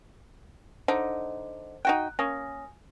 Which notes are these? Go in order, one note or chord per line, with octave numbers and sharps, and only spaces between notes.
D3 D#4 C5
D#4 F#4 G5 F#6
A#3 C#4 G#5 D#6 A#6